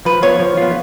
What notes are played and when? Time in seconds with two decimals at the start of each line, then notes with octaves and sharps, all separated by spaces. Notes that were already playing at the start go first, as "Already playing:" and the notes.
0.05 F3 B4
0.22 B3 F4 C#5
0.40 F3
0.57 B3 F4